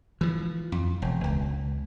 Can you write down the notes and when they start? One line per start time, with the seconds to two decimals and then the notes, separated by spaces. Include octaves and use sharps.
0.21 E3 F3
0.72 F2
1.02 E1
1.24 C#2